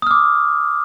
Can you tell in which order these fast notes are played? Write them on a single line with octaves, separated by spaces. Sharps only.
D#6 F6 D6